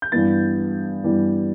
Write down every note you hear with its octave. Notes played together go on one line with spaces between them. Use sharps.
G6
G2 E3 G3 B3 A6
G2 E3 G3 B3